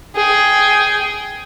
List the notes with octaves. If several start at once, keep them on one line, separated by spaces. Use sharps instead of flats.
G#4 G5